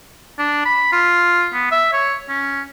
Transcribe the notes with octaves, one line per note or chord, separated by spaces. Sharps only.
D4
B5
F4
B3
E5
C#5
C#4